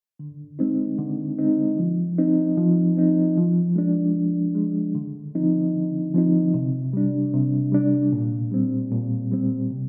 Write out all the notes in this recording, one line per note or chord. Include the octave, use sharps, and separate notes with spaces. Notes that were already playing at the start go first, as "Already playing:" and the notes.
D3
G#3 C4 D#4
D3
G#3 C4 D#4
F3
C4 D#4
F3
C4 D#4
F3
G#3 D4
F3
G#3 D4
D3
F3 C4 D#4
D3
F3 C4 D#4
C3
G3 D4
C3
G3 D4
A#2
G3 C4
A#2
G3 C4
C3